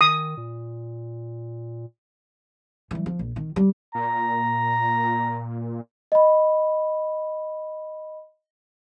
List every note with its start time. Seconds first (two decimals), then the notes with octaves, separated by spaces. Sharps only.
0.01 D#3 D#6
0.37 A#2
2.91 E3 G3
3.06 F3
3.19 A#1
3.36 D#3
3.56 G3
3.95 A#2 A#5
6.12 D#5 B5